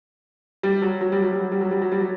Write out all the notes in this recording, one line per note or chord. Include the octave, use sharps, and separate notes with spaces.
G3
F#3
F#3
G3
F#3
G3
F#3
G3
F#3
G3
F#3
G3
F#3